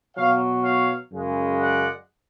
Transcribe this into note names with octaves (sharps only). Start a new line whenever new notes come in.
B2 F#3 C#5 F5
C#5 F5
F#2 C#3 G#3
D5 F#5